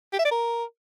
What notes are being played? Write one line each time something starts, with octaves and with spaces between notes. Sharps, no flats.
G4
E5
D5
A#4